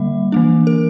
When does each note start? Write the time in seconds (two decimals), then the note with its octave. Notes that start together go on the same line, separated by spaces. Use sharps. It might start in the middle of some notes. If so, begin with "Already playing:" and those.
Already playing: D3 G3 A#3 E5
0.32 E3 A#3 D4
0.67 A#4